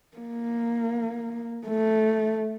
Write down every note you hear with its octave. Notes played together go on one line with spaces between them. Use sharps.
A#3
A3